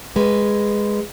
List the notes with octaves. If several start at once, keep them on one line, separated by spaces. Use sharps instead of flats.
G#3 B4